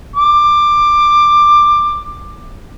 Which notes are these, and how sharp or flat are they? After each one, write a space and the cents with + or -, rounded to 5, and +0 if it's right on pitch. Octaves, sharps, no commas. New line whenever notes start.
D6 +15